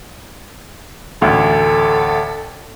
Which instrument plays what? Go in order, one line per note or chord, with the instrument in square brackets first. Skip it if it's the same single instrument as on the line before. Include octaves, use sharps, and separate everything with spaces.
[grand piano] A1 D2 [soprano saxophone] A4